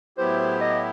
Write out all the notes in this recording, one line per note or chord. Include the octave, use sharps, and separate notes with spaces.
A2 F#3 B3 E4 G4 C5
C5
D#5